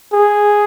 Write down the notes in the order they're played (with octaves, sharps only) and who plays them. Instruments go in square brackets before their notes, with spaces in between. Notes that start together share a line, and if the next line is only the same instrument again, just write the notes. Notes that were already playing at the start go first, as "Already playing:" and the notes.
[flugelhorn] G#4